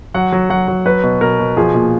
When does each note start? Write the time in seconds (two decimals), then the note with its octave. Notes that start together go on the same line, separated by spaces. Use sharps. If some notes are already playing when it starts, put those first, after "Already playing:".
0.14 F#3 F#5
0.32 F#3
0.50 F#3 F#5
0.68 F#3
0.85 F#3 B4
1.03 B2
1.21 B2 A#4
1.39 B2
1.57 F3 G#4
1.75 A#2